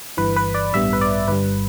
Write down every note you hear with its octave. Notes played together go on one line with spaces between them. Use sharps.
G1 G2 E3 B4
B4
D5
A1 G2 G3 B3 E5
B4
D5
G1 G2 G3 B4